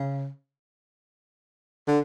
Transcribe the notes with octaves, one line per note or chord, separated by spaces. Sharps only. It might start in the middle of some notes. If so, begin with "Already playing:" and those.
Already playing: C#3
D3